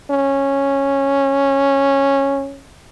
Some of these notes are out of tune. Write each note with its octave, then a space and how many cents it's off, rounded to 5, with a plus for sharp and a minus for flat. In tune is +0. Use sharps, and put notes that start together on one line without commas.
C#4 -10